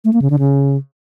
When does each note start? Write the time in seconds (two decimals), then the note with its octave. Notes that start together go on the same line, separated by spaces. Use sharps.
0.05 A3
0.13 A#3
0.22 C#3
0.30 D3
0.39 C#3